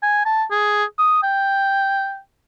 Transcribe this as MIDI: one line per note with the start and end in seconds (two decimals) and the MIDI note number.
0.03 0.24 80
0.25 0.44 81
0.51 0.84 68
0.98 1.18 87
1.23 2.18 79